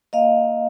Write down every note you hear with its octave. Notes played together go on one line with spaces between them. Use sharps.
A#3 D#5 F5